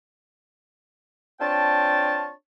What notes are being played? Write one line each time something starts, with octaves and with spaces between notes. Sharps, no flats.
C4 D4 F4 C#5 G5 A5